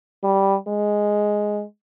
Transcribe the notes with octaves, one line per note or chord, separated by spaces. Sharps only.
G3
G#3